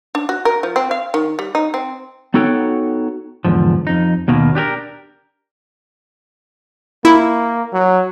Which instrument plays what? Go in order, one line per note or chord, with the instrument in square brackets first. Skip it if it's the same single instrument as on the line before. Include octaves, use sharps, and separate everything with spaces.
[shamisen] D4
F#4
A#4
F3
C4
F5
D#3
G3
D#4
C4
[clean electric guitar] B3 D#4 F#4 A4 C#5 G5
E2 G#2 D3 F3
F2 D#4
D#2 B2 D#3 A#3
D4 G4 G#4 A#4
[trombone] A#3 [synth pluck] E4
[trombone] F#3